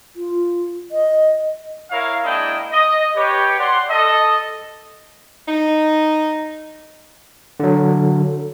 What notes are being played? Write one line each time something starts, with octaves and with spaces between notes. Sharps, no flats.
F4
D#5
E4 A#4 C#5 F5
G#3 A#3 D4 E4 D#5 G5
D#5
G4 B4 C#5
D5 F#5 C6
A4 D#5
D#4
D3 F#3